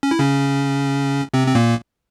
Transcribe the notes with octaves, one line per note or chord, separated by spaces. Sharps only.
C#4
E4
C#3 C#4
C3 C4
C4
A#2 A#3